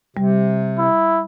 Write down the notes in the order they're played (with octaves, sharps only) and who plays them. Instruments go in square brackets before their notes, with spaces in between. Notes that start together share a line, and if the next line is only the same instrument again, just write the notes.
[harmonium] C3 [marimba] G3
[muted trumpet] E4